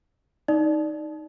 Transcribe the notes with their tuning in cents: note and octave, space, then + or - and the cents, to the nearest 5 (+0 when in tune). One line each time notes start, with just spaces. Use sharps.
D#4 +0 D5 +0